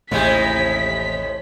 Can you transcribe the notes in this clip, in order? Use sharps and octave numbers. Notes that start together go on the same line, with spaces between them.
A1 D#2 A2 C3 G#3 B6